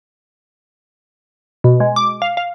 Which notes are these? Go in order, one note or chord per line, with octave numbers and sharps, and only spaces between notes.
B2
G#3
D6
F5
F5